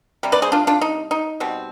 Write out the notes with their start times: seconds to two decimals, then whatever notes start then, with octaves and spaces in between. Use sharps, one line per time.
0.23 C3 G3
0.32 B4 D5
0.42 G#4 C5
0.52 D4 F4
0.67 D4 F4
0.81 D#4
1.11 D#4
1.40 B2 G3 C4